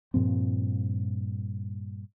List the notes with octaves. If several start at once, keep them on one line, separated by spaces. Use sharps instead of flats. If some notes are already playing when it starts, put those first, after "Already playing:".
G2 A#2 F3 C4